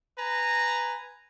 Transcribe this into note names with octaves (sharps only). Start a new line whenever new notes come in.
B4 G#5 A#5